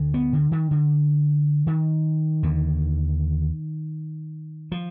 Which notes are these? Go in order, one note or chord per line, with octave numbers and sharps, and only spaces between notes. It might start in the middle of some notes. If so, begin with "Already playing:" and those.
Already playing: D2 D3
B3
D3
D#3
D3
D#3
D#2 D3
F3